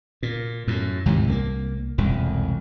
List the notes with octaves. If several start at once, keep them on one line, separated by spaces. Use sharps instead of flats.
A#2
F#2 A2
D#2 G#2 C3 E3
C2 G#3 A#3
E1 C2 F2